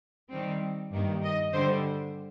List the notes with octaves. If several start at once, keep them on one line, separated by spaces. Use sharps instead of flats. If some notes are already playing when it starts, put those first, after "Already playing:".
D#3 G3 C4
G2 D#3 A#3
D#5
D3 G3 C5